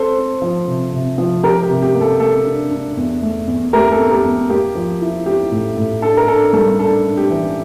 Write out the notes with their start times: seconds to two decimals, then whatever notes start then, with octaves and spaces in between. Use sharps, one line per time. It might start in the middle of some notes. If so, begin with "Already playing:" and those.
Already playing: C4 A4 C5
0.16 C4
0.42 F3
0.67 C3
0.92 C3
1.18 F3
1.43 F3 G4 A#4
1.63 G4
1.69 C3
1.82 G4
1.95 A#3
2.01 A4
2.20 A#3 A4
2.46 D4
2.71 D4
2.97 E2
3.22 A3
3.47 E2
3.73 A3 G4 A#4
3.92 A4
3.99 E2
4.11 G4 A#4
4.25 E2
4.50 A#3 G4
4.75 F3
5.01 E4
5.26 E4 G4
5.51 A2
5.77 A2
6.02 D4 A4
6.17 A#4
6.28 D4 A4
6.53 G3 A4
6.79 D4 A4
7.04 D4
7.17 G4
7.30 E3